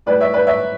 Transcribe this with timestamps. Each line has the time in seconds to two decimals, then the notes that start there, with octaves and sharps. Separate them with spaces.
0.06 A2 G3 B4 D5
0.20 C#5 E5
0.33 B4 D5
0.47 C#5 E5